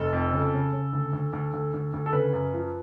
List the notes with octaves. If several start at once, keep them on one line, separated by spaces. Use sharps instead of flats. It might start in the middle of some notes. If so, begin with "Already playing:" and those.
Already playing: F1 A4
F2
C#3
C#3
C#3
D2
D2
D2
D2
D2
D2
A4
C#3 B4
F#2
F3